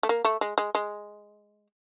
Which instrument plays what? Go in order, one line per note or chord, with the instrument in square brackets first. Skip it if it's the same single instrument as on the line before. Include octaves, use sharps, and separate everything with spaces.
[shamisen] A3
A#3
A3
G#3
G#3
G#3